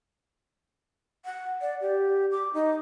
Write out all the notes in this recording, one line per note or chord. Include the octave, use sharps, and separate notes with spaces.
F#5
D5
G4
D6
D#4